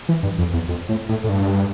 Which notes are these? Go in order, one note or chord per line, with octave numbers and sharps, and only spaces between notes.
E3
G2
F2
E2
F2
A2
A2
A2
G2